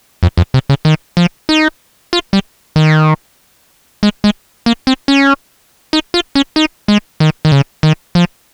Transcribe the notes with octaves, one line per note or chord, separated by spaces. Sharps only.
F2
F2
C3
C#3
D#3
F3
D#4
F4
G3
D#3
G#3
G#3
A#3
C4
C#4
D#4
F4
C#4
D#4
G#3
D#3
D#3
C#3
D#3
F3